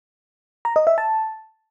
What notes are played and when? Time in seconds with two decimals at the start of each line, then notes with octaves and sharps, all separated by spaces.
0.65 A#5
0.76 D#5
0.87 E5
0.98 A5